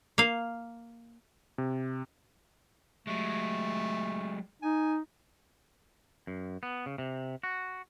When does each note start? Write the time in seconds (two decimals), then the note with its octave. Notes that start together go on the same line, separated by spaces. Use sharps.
0.18 A#3 F5
1.58 C3
3.07 F#3 G#3 A3
4.62 D#4 G#5
6.27 F#2
6.63 B3
6.86 C#3
6.98 C3
7.43 F#4